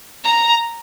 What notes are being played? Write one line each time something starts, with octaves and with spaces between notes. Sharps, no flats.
A#5